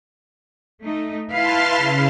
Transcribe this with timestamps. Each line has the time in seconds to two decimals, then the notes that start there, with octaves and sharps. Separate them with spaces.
0.82 A3 D#4
1.31 E4 B4 F5 A5 C6 F6
1.77 C#3